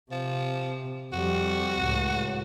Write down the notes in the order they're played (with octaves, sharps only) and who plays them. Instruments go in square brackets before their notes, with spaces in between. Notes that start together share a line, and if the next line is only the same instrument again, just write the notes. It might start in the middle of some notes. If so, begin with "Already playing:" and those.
[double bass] C3 [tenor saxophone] F3
[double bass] F2 G3 [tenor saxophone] F#4
[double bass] C#2 A2